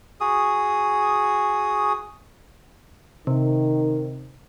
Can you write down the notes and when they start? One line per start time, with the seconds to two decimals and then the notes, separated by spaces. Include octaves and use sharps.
0.21 F#4 G#4 D#6
3.27 C3 D#3